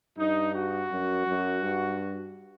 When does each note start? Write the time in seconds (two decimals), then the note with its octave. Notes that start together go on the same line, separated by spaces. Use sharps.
0.18 G2 D#4
0.55 F#4
0.91 F#2
1.27 F#2
1.62 G2